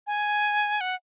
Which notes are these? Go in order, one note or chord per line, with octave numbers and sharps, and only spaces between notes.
G#5
F#5